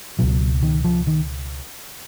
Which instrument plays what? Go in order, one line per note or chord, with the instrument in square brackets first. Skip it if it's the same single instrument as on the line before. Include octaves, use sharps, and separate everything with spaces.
[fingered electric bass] C#2 B2 F#3
D#3
F3
D#3